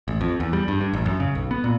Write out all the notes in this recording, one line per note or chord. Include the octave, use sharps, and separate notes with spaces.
A1
F2
E2
G3
G2
G2
A1
F#2
C#3
B1
B3
A#2